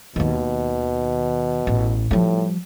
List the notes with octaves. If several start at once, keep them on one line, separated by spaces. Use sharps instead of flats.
D#2 B2 D#3
A1
A2 F3 G3